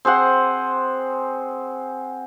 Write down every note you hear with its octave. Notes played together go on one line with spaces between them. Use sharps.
C4 G#4 C5 F#5